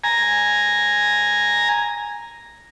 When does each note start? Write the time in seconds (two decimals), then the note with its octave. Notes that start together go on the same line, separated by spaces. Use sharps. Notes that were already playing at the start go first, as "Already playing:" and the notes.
0.04 G#5 A#5